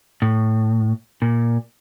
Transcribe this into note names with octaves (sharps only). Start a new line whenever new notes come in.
A2
A#2